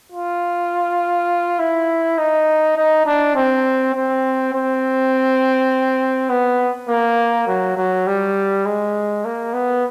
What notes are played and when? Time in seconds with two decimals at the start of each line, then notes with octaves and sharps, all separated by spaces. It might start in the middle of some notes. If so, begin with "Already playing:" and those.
0.12 F4
1.59 E4
2.18 D#4
2.77 D#4
3.06 D4
3.36 C4
3.95 C4
4.54 C4
6.30 B3
6.89 A#3
7.48 F#3
7.77 F#3
8.07 G3
8.66 G#3
9.25 A#3
9.53 B3